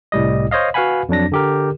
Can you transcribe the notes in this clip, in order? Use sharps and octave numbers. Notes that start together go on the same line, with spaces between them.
C2 A2 G3 D#5
C5 C#5 D#5 F5
F#4 B4 F5 F#5 G#5 B5
F2 F#3 D4 A#6
D3 G4 A#4